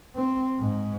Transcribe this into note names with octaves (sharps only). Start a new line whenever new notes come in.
C4
G#2